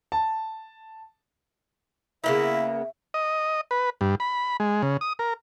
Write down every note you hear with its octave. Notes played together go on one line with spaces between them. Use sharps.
A5
C#3 A#3 B3 E4 E5
D#5
B4
G2
B5
G#3
C#3
D#6
A#4